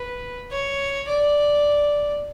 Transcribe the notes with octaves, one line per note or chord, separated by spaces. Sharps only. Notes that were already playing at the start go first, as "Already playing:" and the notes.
Already playing: B4
C#5
D5